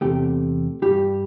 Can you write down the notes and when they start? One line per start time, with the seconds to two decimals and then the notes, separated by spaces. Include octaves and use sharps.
0.01 E2 C3 A3 G4
0.82 G2 G3 G4